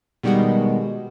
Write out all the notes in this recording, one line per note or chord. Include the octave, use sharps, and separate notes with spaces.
B2 D#3 G3 G#3 F#4